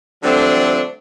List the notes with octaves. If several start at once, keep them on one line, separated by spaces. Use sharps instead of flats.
D3 F3 G3 A3 C4 D4